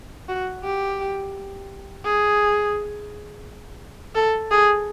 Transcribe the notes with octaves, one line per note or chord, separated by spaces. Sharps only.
F#4
G4
G#4
A4
G#4